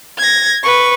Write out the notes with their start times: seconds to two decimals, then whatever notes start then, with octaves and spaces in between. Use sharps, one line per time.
0.18 G#6 A#6
0.62 B4 C#6